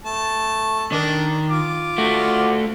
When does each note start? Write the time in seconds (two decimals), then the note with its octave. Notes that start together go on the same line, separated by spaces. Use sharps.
0.04 A3 A5
0.92 D#3 D4 A#4
1.50 F4 D6
1.98 A3 F#4